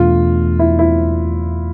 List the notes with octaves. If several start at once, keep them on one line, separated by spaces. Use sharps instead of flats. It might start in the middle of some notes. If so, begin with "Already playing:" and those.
Already playing: E2 B2 A3 D4 F4
E4
E4